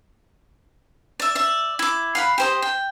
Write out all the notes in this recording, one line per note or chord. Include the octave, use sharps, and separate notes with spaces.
D5 E5
D5 E5
E4 D6
F5 F#5 B5
G4 C5 D#5
G5